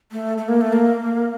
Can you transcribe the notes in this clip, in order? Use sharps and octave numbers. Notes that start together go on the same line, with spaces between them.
A3
A3
A#3
A3
A#3